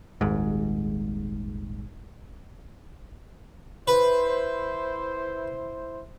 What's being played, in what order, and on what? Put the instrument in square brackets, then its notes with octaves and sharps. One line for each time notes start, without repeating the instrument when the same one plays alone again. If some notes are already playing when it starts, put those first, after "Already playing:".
[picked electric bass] D#1 G#1 G#2
[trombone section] E4 C5 [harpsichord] B4